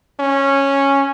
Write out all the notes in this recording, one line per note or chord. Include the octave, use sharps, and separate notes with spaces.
C#4